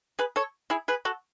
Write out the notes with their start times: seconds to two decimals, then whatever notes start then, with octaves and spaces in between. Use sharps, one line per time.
0.19 G#4 B4
0.36 A4 C#5
0.70 E4 G#4
0.88 G#4 B4
1.05 F#4 A4